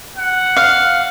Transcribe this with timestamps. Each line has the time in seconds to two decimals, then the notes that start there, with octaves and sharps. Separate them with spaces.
0.17 F#5
0.57 F5